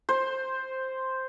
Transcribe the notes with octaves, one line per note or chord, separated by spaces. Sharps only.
C5